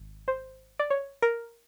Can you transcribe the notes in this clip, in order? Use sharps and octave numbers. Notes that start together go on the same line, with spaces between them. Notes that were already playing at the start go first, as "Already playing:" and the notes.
Already playing: G#1
C5
D5
C#5
A#4